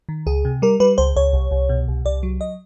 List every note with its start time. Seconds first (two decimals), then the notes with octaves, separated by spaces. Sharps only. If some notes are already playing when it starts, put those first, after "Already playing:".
0.09 D#3
0.26 C#2 G#4
0.45 C3
0.62 G3 A#4
0.80 G3 B4
0.98 C#2 C5
1.16 C#2 C#5
1.33 C2
1.51 C2
1.69 B2
1.88 C2
2.05 C2 D5
2.23 F#3
2.41 D#5